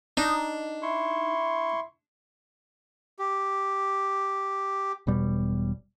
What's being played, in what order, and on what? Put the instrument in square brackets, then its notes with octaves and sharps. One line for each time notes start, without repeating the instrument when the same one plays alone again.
[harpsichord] D4 [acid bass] D#4
[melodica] E4 C6 C#6
G4
[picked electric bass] E1 B2 G3